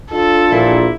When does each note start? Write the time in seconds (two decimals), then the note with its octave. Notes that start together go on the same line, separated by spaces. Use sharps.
0.11 D4 F4 A4
0.51 A#1 A#2 E4